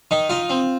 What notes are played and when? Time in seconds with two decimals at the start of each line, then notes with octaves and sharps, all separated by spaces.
0.11 D#3 D#4
0.29 D#4 F4
0.50 C4